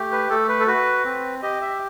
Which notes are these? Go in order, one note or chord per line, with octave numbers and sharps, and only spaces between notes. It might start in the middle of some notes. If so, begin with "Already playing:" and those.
Already playing: A3 G4
B4
A3 A4
B4
A4
F#4 B4
C4
G4 D#5
E5